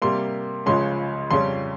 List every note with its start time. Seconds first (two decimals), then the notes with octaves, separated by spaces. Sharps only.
0.02 C3 G3 A#3 C6
0.66 C#2 C#3 F3 G#3 C#4 C6
1.31 F2 C#3 G3 C#4 C6